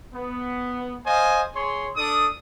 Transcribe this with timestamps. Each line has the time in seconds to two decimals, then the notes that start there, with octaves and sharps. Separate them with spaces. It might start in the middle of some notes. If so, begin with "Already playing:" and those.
0.13 B3
1.05 C5 D#5 F5 G#5
1.54 G#4 C#5 C6
1.96 D4 A4 D#6